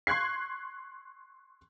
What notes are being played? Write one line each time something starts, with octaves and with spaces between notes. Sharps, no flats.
C6 C#6 F#6 G#6 C7